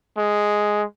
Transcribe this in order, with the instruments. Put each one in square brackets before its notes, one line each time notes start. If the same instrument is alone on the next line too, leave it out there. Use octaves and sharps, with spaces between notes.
[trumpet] G#3